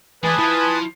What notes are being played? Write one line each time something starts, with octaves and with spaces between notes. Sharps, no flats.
E3 G#3 B4 D5 G#5 A5 D#6
F3 E4